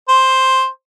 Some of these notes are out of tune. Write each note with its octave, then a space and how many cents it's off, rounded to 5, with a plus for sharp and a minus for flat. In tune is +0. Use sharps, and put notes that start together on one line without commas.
C5 +5